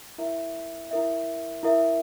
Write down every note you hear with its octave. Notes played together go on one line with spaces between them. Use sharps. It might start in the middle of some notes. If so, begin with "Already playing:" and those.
E4 A#4 E5
E4 A#4 E5
E4 A#4 E5